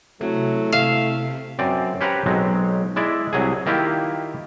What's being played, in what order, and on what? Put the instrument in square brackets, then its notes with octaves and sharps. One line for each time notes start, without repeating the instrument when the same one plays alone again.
[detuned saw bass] C3 [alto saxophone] F#3 [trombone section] A3 E4
[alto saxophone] E5 [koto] F5
[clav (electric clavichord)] F#2 C4 D5
C#4 G4 B4 C5 F#5 A#5
B1 F#3 G#3 C4
G#3 E4 D5 E5
C2 F#3 G#4
D#3 A#3 E4 F4 G4